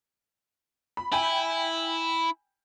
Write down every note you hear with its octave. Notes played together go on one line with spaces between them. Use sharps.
B5
E4 G5 G#5 B5